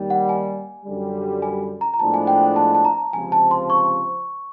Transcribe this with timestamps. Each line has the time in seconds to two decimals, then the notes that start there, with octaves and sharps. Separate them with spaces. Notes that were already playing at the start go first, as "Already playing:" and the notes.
Already playing: D#2 D#3 G3
0.10 F#5
0.29 G#5
0.85 F#2 D3 G3
1.42 G#5
1.81 A#5
1.94 A#5
1.99 A2 F3 G#3 B3 D4 A5
2.14 G#5
2.27 G5
2.56 A5
2.75 A5
2.85 A#5
3.13 C#2 C3 F3 G#5
3.32 A5
3.51 C6
3.70 C#6